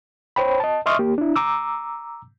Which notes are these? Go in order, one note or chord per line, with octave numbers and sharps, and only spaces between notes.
C5 C#5 G5 B5
D#5 A5
D#5 E5 C6 C#6 D#6 F6
A#3 G4
D4 E4
A#5 D6 E6